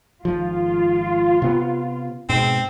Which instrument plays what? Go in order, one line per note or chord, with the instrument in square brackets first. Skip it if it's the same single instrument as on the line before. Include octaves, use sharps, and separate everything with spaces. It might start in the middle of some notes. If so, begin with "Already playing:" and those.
[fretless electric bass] G#1 F3 [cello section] F4
[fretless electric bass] C3 B3
[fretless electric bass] G#2 B2 [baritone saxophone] C4